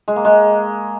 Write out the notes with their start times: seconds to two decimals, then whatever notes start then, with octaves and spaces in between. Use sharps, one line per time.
0.08 G#3
0.16 A#3
0.25 G#3